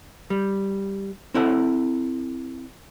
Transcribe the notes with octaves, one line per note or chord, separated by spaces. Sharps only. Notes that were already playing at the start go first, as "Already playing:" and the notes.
G3
C4 E4 A4 F#5